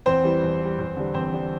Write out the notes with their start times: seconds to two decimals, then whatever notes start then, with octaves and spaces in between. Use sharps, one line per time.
0.06 E2 C4 C5
0.23 E3 G3
0.43 E2
0.60 E3 G3
0.78 E2
0.96 D3 G3
1.14 E2 C4 C5
1.33 D3 G3